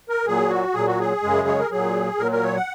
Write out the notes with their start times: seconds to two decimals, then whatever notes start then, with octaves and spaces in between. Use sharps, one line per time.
0.09 A#4
0.26 A#2 F#3 G#4
0.50 F#4
0.74 A#2 F#3 G#4
0.87 F#4
0.99 G#4
1.23 F#2 C#3 G#3
1.48 C#5
1.59 A#4
1.71 A#2 F#3 G#4
2.19 A#2 F#3 A#4
2.32 A#4
2.43 C#5
2.55 F#5